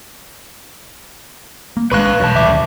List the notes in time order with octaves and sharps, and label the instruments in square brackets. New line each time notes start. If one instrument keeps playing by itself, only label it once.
[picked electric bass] A#3
[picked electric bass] A#1 F3 G#3 [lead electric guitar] B4 F5 [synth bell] B5 C#6 F#6
[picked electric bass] E1 [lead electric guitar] F#2 A5
[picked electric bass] D#1 G#1 D2 [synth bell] E5 D6